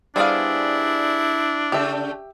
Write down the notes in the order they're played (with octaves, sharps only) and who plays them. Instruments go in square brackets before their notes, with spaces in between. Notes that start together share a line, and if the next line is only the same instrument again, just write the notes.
[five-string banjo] G3 B3 F5 [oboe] D4 [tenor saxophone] E4 [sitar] G#4 C5 D5
[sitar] C#3 A3 [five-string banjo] G4 E5